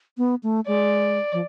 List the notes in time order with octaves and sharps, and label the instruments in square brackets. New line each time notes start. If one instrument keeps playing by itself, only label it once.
[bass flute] B3
A3
[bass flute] G#3 [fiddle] D5
[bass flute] F3